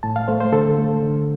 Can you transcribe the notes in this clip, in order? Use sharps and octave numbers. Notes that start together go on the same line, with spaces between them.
A2 A5
F5
A3 C5
C5
D3 A4
A3
D3